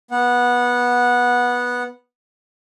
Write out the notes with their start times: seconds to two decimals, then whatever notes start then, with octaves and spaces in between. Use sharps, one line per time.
0.11 B3 F#5